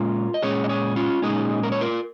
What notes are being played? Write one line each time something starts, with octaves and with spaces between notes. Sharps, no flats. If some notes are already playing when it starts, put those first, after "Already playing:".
Already playing: A#2 G#3 C#4 F4 A#4
D#5
A#2 G#3 C#4 G#4 C#5
D#5
G#4 C#5
C#4 F4
A#2 G#3 C#4 D#4 G#4
A#4
C#5
F4 A#4